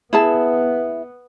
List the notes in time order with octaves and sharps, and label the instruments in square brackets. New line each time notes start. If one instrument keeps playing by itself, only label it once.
[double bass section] B3 [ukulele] E4 G#4 A5